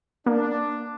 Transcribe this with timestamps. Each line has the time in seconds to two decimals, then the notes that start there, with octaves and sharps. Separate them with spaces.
0.26 A#3 D4